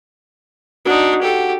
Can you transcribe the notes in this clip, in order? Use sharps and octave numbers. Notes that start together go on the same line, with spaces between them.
D4 D#4 F#4
G4 A4